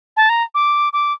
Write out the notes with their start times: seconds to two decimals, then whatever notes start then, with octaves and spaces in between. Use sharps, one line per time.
0.17 A5
0.29 A#5
0.55 D6
0.93 D6